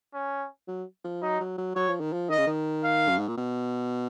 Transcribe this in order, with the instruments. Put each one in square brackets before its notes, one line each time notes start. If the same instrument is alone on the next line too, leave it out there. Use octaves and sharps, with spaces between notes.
[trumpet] C#4
[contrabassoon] F#3
F3
[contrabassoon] F#3 [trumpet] D#4
[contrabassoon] F#3
F#3
[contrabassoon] F#3 [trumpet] C#5
[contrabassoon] F3
D#3
F3
[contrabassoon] D#3 [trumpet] D#5
[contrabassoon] C#3
D#3
[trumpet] F5
[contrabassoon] F#2
G#2
A#2
B2